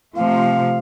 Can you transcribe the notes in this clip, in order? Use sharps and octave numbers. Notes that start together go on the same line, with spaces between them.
C3 F3 A3 F5